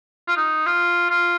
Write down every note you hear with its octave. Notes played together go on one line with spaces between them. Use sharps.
F4
D#4
F4
F4